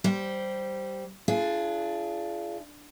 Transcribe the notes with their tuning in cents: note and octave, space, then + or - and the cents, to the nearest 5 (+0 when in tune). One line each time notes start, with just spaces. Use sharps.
G3 -10 C5 +0
D4 +5 F4 -30 G#4 +25